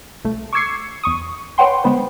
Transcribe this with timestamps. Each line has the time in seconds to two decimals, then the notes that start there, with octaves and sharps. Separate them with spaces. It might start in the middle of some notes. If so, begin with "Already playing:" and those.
0.25 C2 A3
0.53 C#6 D6 E6 G#6 C7 C#7
1.03 E2 C#6 D#6
1.58 B4 C#5 F#5 G5 C6
1.84 D3 G#3 B3 B4 C5